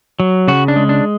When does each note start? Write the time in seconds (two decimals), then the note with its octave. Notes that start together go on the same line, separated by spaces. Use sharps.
0.20 F#3
0.48 C#3 F#4
0.68 D4
0.76 G#3
0.89 D4